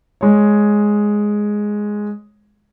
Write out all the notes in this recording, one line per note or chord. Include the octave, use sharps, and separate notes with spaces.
G#3 C#5